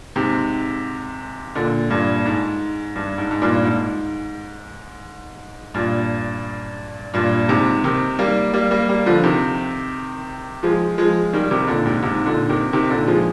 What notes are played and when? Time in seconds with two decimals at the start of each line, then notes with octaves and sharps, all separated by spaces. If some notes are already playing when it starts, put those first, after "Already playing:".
0.16 G#2 C3
1.55 A#2 D3
1.90 G2 A#2
2.25 G#2
2.96 G2
3.18 G#2
3.31 G#2
3.42 G2 A#2
3.64 G#2
5.74 G2 A#2
7.14 G2 A#2
7.48 G#2 C3
7.84 C3 D#3
8.19 G3 A#3
8.53 G3 A#3
8.71 G3 A#3
8.89 G3 A#3
9.06 D3 F3
9.23 C3 D#3
10.63 F3 G#3
10.98 F3 G#3
11.33 D#3 G3
11.51 C3 D#3
11.68 A#2 D3
11.86 G#2 C3
12.02 G#2 C3
12.26 A#2 D3
12.49 C3 D#3
12.73 C3 D#3
12.90 A#2 D3
13.07 F3 G#3